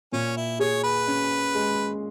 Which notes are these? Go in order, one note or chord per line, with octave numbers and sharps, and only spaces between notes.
A#2 C#4
E4
G#4 C#5
B4
C#4
G#3